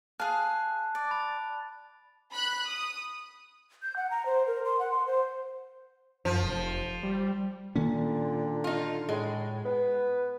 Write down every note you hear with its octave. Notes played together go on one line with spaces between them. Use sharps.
G#4 F5 A5 F#6
F#6
D5
B5 A6
B5 F#6
D#6
G6
F#5
A#5
C5
A#4
C6
F#5
C6
C5
F#2 F3
F1
G3
A#2 D3 D#3 A#3 C#4
D#4 F4
A2 G#3
B3 B4